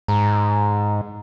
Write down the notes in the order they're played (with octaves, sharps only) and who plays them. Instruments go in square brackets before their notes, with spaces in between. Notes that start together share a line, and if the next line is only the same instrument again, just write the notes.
[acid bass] G#2 [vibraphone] A#5